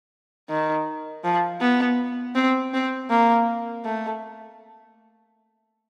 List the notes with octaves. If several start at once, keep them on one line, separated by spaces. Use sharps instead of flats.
D#3
F3
B3
C4
C4
A#3
A3